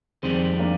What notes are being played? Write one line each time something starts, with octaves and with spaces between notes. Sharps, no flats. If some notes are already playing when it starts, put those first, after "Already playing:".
F2 D#3 G3 G#3 C4
A#3 D4